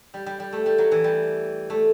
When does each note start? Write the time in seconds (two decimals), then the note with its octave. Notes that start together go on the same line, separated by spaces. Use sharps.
0.14 G3
0.26 G3
0.40 G3
0.53 A3
0.66 G3
0.78 F#3
0.92 E3
1.04 G3
1.70 A3